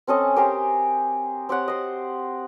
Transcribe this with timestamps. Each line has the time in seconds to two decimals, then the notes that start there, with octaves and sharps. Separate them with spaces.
0.07 C4 C#4 A4 D#5
0.36 G4 A#4 C5 G#5
1.49 C4 G4 C#5 F#5
1.68 C5 D#5